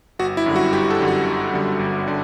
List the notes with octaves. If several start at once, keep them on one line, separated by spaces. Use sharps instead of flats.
G1 F#4
E4
F#2 D3 G3
F#4
G1 G4
A4
F#2 D3 G3
F#4
G1
F#2 D3 G3
G1
D3